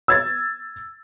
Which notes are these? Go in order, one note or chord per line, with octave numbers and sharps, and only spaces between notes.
E6 G#6 A6